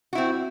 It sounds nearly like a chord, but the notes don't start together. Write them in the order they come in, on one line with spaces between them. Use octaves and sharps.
F#4 E4 C4